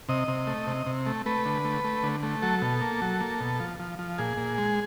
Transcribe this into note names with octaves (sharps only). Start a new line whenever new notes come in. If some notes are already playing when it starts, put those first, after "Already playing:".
C3 D#5
C3
A3
C3
C3
A3
A3 B4
D3
A3
A3
D3
A3
F#3 A4
B2
A#3
F#3
A#3
B2
F3
F3
F3
A#2 G#4
A#2
G#3